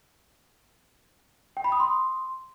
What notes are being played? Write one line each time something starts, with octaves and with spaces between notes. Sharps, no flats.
G5
B5
D#6
C6